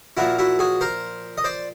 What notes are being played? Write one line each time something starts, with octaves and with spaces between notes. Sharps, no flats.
A#2 F3 E4 F#4
E4 F#4
F#4 G#4
A#4 C5
D#5
C5 D5